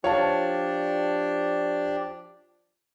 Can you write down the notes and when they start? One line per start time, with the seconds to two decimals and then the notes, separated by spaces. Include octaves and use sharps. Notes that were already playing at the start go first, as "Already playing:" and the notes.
0.04 F3 D4 G4 C#5 D5 F5 A5